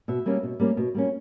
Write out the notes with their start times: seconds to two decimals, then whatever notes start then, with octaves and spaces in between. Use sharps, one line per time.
0.08 B2 E5
0.26 G3 A#3 C#4
0.43 B2
0.60 G3 A#3 C#4
0.77 B2
0.94 G3 A#3 C#4